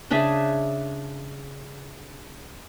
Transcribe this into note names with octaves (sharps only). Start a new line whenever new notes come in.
C#3 D4 G#4 E5